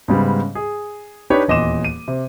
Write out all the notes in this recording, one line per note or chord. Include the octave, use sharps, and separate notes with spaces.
G#2 C#3 G3 B3
G#4
D4 D#4 G4 B4 C#5
D#1 E2 D#5 C6 D6 E7
D#7
C3